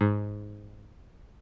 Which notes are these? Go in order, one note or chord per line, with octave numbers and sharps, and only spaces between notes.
G#2